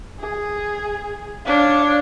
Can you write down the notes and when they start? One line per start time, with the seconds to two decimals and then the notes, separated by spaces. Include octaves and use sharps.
0.19 G#4
1.46 D4 C#5 F5